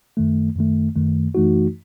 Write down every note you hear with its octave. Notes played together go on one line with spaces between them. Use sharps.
F#2 D#3 A3
F#2 D#3 A3
F#2 D#3 A3
F#2 E3 A3 D#4 F#4